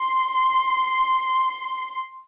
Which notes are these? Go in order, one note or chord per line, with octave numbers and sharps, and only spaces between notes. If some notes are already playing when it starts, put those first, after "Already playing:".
Already playing: C6